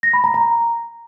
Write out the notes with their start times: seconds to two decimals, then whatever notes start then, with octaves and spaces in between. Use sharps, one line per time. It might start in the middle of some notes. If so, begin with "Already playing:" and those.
0.03 A#6
0.13 B5
0.24 A#5
0.34 A#5